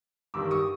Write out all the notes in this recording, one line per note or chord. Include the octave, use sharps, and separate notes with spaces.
G2 D#3 G3 D6 E6
C#6 D#6